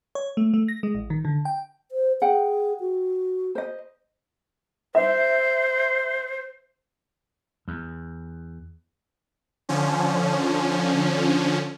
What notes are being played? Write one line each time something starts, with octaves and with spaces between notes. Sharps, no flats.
C#5
A3
A3
A#6
G#3
A1
D#3
D3
G5
C5
G#4 F#5 G5
F#4
C5 D#5
C5 E5
E2
D3 F3 C#4